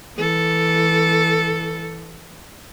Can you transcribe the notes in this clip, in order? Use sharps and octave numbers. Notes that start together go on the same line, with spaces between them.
E3 A4